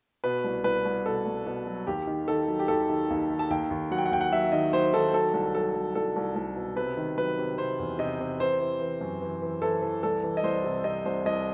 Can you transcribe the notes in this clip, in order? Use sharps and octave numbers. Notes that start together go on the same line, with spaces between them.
B2 B4
C2
C2 B4
C2
B2 A4
C2
B2
F#3
D#2 G4
D#3
D#3 A4
F#3
G4
D#2 A4
D#3
D#2
D#3
A5
D#2 G5
D#2
F#3 F#5
G5
F#5
D#2 G5
F#5
F#3 E5
D#3 D#5
F#3 C5
D#3 A4
F#3 A4
C2
F#3 A4
F#3
C2 A4
C2
C2
B2
C3 B4
D#3
F#3 B4
C3
C3 C5
E2
C3 D#5
C3
E3 C5
E3
E3
F#2
E3
E3
E3 A4
E3
C2 A4
E3
D#5
C2 C5
C3
C3 D#5
C2 C5
C2 D#5